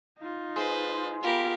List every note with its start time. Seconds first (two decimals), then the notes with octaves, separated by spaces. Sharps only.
0.19 D#4 F4
0.56 G#3 B4 C5
1.23 B3 F4 G4 A#4 B5